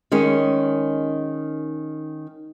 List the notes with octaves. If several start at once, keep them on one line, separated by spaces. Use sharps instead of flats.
D#3 G#3 C#4